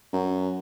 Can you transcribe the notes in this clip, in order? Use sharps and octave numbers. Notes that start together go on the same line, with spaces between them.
F#2